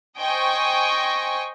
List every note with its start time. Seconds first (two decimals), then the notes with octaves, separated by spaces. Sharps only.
0.18 C5 D#5 G5 G#5 C#6